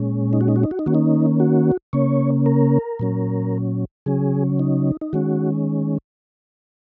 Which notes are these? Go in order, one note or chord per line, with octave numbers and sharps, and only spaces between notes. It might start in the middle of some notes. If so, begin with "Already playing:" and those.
Already playing: A#2 G#3 C#4
D#4
F#4
D#4
F#4
D#4
F#4
D#4
D#3 A#3 C#4 F#4
D#4
F#4
C#3 A#3 C#4 C#5
A#4
A#2 F#3 C#4
C#3 F#3 C#4 G#4
D#4
D#4
D#3 G#3 C#4 F#4